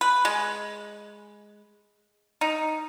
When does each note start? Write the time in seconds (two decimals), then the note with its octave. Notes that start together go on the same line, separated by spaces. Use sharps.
0.01 B4
0.25 G#3
2.41 D#4